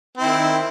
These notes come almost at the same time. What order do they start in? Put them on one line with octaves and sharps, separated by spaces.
C4 E4 D#3